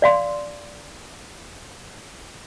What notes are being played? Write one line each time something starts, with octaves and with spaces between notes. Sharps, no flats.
D5 F5 C6